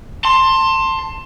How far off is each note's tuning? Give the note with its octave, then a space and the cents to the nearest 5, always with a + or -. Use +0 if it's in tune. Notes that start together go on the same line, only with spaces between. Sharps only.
A5 +25 C6 +10